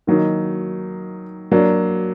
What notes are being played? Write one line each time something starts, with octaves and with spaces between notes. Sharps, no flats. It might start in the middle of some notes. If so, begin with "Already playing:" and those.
D#3 F#3 A#3 D#4
F#3 A#3 D4